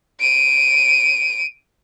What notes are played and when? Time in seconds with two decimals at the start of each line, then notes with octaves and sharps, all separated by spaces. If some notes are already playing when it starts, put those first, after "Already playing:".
0.20 D7 D#7